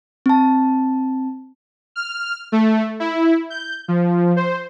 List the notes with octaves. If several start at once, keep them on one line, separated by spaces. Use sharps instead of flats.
C4 A5
F6
A3
E4
G6
F3
C5